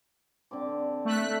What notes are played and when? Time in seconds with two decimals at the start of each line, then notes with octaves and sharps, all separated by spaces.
0.51 D3 C4 D6
1.05 A3 F#6 B6